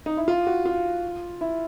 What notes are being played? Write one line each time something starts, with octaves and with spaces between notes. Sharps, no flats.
D#4
E4
F4
F#4
F4
E4